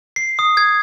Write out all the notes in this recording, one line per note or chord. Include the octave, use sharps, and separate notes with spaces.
C7
D#6
G#6